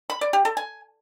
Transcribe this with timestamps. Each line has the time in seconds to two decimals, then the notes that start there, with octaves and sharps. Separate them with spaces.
0.10 B5
0.21 D5
0.33 G4
0.45 A4
0.57 G#5